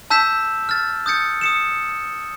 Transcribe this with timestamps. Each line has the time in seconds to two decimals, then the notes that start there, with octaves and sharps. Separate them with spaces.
0.10 A5 E6 G6 B6 E7
0.69 F6 A6
1.06 D#6 G6 A6 C#7
1.41 D#6 C#7 E7